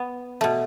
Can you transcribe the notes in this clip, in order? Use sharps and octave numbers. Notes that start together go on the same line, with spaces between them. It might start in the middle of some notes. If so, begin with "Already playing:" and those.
Already playing: B3
B2 A3